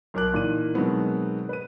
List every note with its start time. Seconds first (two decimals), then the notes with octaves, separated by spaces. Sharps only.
0.14 B1 A#4 D6 F#6
0.34 A#2 D#3 E3 D#7
0.74 B2 D#3 F#3 G#3 B3 C4
1.49 B4 D#7